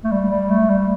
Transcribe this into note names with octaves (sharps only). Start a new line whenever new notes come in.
A3
G3
G3
A3
G3